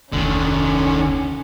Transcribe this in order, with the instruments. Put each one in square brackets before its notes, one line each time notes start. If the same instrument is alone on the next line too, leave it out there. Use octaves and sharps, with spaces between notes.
[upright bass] F1 D2 [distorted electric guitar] D3 D#3 [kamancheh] C#4